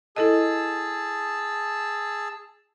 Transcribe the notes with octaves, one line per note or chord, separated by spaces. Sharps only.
E4 G#4 A4 D#5 A5 E6